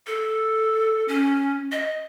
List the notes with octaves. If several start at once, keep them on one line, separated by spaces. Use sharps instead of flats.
A4
C#4
D#5